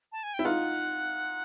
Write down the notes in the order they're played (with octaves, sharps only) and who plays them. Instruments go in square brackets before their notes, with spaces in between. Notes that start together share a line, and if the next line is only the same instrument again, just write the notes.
[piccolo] A5
G#5
G5
[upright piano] E4
[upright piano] D#4 F4 [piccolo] F#5